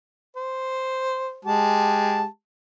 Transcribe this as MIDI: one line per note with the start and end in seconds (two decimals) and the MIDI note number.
0.37 1.39 72
1.45 2.26 56
1.45 2.26 67
1.45 2.26 81